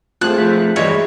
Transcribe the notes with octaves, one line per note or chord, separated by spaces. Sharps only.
A3 C4 F4 G#4 F#5 A5 F#6
F3 A3 F4
G2 E3 G3 G#3 E4 F#4 C#5